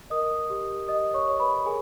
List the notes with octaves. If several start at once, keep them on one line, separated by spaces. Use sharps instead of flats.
A#4 D#5 D#6
G4
G4 D#5 D#6
C#5 C#6
C#5
B4 B5
G#4 A#4 G#5